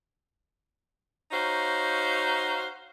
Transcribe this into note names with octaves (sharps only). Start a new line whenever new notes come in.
D#4 F#4 C5 C#5 F5